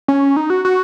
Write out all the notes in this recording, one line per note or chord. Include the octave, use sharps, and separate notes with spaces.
C#4
D#4
F#4
F#4